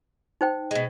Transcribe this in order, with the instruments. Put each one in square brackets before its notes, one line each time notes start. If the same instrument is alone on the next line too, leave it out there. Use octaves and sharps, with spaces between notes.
[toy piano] D#4 C5 G5
[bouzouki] B2 G#3